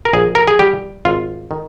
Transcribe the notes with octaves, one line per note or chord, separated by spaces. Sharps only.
A#4
A#1 G#4
A#4
G#4
G3 G4
G#1 F4
D#3